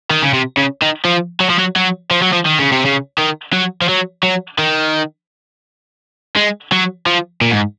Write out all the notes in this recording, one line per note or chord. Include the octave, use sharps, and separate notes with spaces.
D#3
C#3
C3
C#3
D#3
F3
F#3
F3
F#3
F#3
F3
F#3
F3
D#3
C#3
C3
C#3
D#3
F#3
F3
F#3
F#3
D#3
G#3
F#3
F3
A#2
G#2